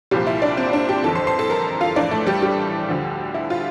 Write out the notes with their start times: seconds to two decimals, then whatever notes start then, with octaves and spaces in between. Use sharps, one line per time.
0.11 C2 A#2 F3 G3 G4
0.27 E4
0.42 D4 D5
0.57 C4 C5
0.73 D4 D5
0.89 G4 G5
1.03 G1 F2 E3 A4 A5
1.15 C5 C6
1.27 C5 C6
1.39 A4 A5
1.50 A#4 A#5
1.81 F4 F5
1.96 A#1 A2 E3 D4 D5
2.11 A3 A4
2.27 G3 G4
2.42 G3 G4
2.89 D2 D3 F3
3.34 E4
3.50 F4